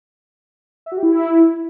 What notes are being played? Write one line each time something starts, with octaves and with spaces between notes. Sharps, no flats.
E5
F#4
G4
E4